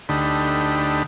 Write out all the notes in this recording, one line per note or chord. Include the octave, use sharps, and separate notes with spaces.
D2 D3 A3 D#4 G4 B5